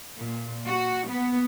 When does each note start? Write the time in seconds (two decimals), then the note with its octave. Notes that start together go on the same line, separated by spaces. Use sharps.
0.18 A#2
0.66 F#4
1.08 B3